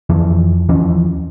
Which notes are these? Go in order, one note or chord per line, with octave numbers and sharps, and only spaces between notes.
F2 E3 F3
E2 E3 F3 C#4